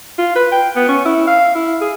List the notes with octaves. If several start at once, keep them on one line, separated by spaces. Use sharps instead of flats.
F4
B4
G5
B3
C#4
E4
F5
E4
G#4